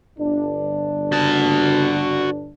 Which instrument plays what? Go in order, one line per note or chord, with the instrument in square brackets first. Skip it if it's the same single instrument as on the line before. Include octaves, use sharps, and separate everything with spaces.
[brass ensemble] G1 D4
[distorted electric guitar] F#4 A5